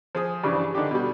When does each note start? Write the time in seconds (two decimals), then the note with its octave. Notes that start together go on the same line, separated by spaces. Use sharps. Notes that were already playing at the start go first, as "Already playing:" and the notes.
0.15 F3 G#4 D#6
0.44 G2 C#3 E3 G3 D4
0.75 D3 D4 D#4 G4
0.91 B2 G3